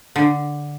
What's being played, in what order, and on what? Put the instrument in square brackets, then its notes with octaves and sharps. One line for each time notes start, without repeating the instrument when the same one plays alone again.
[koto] D3